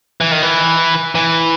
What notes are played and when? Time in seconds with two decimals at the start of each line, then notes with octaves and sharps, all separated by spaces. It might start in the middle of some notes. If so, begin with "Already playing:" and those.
0.21 E3
0.32 D#3
0.42 E3
1.15 E3